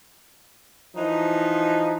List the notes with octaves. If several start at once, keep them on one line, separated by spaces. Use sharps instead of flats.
E3 F3 D#4